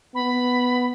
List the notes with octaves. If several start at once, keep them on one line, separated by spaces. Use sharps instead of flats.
B3 B5